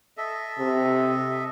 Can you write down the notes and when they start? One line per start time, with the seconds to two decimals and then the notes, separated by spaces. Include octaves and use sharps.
0.17 A4 D#5 E5
0.59 C3